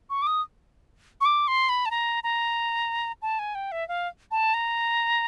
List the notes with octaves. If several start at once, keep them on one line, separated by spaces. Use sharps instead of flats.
C#6
D6
D#6
C#6
D6
C6
B5
A5
A#5
A#5
A5
G#5
G5
E5
F5
A5
A#5